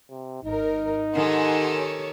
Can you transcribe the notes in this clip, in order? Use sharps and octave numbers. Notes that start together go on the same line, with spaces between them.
C3
G#1 D#4 A#4
D#3 G4 A4 F#5 G#5 C6
C#5